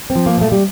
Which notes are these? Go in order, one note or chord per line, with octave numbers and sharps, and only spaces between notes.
C4
F3
A#3
A#2 A3
G3